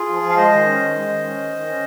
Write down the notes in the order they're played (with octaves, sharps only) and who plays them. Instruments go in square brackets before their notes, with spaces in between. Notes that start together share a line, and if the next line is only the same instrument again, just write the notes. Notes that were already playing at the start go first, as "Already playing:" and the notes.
Already playing: [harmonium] F4 G#4
F3
F3
F5
G#3 C5 D#5
D#3
C#4
D#3
G#3
D#3
C#4
D#3
D#3
C#4